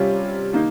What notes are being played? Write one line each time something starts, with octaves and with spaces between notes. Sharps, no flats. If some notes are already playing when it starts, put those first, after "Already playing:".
Already playing: C3 G3 C#4 F4
D#3 A#3 D#4